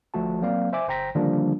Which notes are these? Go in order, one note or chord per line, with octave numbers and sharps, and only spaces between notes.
G1 F3 A3 F#4 A5
F#3 A#3 C4 D5 F5
C5 E5 G#5 D6
G1 C5 G5 A#5 A#6 B6
D3 D#3 F3 G3 A#3 D4